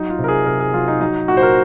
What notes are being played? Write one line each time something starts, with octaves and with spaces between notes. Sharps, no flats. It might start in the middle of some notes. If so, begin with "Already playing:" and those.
Already playing: F#3 D#4
F4
C3
A#4
G#4
C3 A#4
G#4
F#3 F4
D#4
F#3 D#4
A#2 F#4
C5
A#4